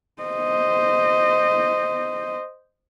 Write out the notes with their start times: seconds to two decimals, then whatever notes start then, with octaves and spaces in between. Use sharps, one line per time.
0.22 C5 D#5